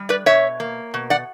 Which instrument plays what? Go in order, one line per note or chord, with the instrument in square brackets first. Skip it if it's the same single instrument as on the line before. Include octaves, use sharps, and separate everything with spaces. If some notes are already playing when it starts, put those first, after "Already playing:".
Already playing: [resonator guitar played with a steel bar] G3
B4 D5
B2 C#5 E5
A#3
B2
D5 F#5